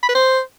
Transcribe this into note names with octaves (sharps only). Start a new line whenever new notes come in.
B5
B4
C5